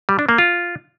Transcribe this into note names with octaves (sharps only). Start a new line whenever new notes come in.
G3
D4
A#3
F4